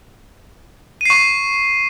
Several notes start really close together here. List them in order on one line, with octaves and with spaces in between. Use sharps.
D#7 C7 C#6